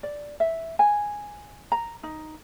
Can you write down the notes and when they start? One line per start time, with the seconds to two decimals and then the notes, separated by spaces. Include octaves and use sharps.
0.03 D5
0.40 E5
0.79 G#5
1.72 A#5
2.03 D#4